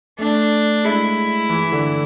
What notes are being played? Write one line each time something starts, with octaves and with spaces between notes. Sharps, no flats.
A3 D4
G#3 E4
E3
D3